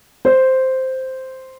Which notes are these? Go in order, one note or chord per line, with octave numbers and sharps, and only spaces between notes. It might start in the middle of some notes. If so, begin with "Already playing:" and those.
C5